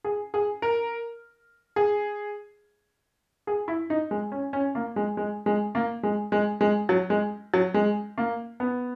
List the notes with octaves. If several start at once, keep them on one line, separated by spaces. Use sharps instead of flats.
G#4
G#4
A#4
G#4
G#4
E4
D#4
G#3
C#4
C#4
A#3
G#3
G#3
G#3
A#3
G#3
G#3
G#3
F#3
G#3
F#3
G#3
A#3
B3